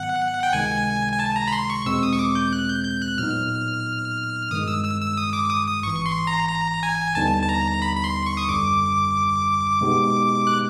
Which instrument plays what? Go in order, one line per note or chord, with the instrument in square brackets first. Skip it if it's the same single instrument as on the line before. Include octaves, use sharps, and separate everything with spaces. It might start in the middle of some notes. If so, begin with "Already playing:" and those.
Already playing: [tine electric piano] G#2 D#3 F#3 B3 [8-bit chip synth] F#5
[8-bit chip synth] G5
[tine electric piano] C#2 C3 D#3 G#3 [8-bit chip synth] G#5
[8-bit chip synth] G#5
A5
A#5
B5
C6
C#6
[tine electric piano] E2 B2 G#3 C4 [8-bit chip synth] E6
[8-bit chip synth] D#6
C#6
D6
G6
F#6
G6
G6
F#6
[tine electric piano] A#2 F#3 B3 D#4 [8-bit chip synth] F6
[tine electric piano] G2 D#3 G#3 [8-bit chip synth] D#6
[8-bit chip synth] E6
E6
E6
D#6
D6
D#6
D#6
[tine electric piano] G#1 G#2 E3 [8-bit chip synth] C#6
[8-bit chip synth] C6
A#5
A#5
G#5
[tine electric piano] D#2 D3 G3 B3 D#4 [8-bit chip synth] A5
[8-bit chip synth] A5
A#5
B5
B5
C6
C#6
D#6
[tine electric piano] G1 F#2 D3 G3 [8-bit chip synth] D6
[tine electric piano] B2 G#3 B3 D#4 G4
[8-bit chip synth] F#6